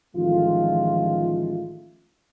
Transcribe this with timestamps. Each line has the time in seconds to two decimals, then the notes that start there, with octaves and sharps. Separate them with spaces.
0.16 A1 D#3 F3 G#3 A3 F4